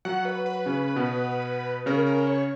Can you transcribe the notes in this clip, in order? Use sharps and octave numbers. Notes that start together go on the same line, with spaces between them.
F#3 F#4 F#5
B4
B4
C#3 C#4
B2 B3
C#3 C#4 A#4
A#4
C#5